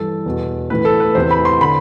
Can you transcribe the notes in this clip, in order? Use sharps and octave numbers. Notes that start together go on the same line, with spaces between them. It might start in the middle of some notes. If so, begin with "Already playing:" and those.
Already playing: G2 E3 A4
E2 B2
A2 E3 B4
A4
B4
E2 C3 E3 C5
B5
C6
D3 B5